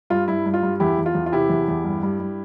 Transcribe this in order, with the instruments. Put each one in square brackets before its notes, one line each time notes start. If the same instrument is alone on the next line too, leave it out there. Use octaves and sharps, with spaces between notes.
[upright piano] G2 F4
G2 E4
G2
F4
G2
E2 E4 G4
E2
F4
E2
F4
C3 E4 G4
E2
E2
G2
G2
G2